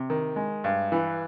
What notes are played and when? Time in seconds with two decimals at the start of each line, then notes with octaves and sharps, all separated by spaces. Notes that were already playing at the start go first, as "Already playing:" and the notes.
Already playing: C3
0.10 D#3
0.36 G#3
0.64 G2
0.92 E3